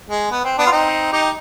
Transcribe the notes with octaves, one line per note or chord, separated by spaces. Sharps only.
G#3
B3
C4
B3 D4
F4
C4 D#4
D#4 G4